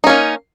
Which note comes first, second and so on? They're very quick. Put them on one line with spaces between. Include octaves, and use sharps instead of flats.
D#4 C#4 A#3